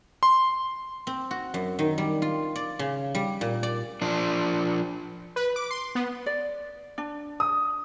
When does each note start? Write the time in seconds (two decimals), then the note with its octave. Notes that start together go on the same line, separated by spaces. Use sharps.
0.23 C6
1.07 C4
1.31 F#4
1.54 F#2
1.79 D#3
1.98 G3
2.22 F4
2.56 D5
2.79 C#3
3.15 G3
3.41 A#2
3.63 D5
4.02 F3 D4
5.36 B4
5.56 D6
5.70 C6
5.95 B3
6.26 D5
6.98 D4
7.40 D#6